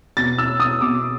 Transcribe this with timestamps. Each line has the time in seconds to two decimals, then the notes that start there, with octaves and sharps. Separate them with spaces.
0.17 B2 A6
0.38 E6
0.60 D#6
0.81 B2 D6